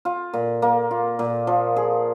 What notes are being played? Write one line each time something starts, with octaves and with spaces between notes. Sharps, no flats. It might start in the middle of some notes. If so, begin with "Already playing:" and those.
F4
A#2
A#3
F4
A#2
F3
G#4